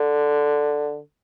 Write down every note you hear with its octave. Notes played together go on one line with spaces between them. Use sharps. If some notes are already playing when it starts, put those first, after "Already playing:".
Already playing: D3